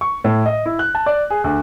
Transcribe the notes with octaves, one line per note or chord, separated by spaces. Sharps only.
C#6
A2
D#5
E4
F#6
A5
D5
G#4
D2